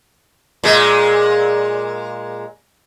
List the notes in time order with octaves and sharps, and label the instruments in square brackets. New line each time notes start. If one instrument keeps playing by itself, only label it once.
[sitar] A#2 G#3